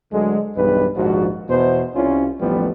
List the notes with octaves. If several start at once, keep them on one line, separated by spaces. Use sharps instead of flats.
D2 D3 F#3 G#3
B1 E2 G2 G#3 B4
A#1 D#2 G#2 F3 F#4
E2 B2 C5
C2 C#4 F4
A1 D#2 F3 G3 A3 B3